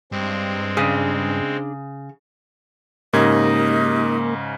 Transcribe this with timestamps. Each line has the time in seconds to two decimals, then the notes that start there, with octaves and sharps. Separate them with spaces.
0.12 G2 G#3 C4
0.77 C#3 D4 G#4
3.13 G#2 C#3 A#3 D#4 G4 A#4 G#6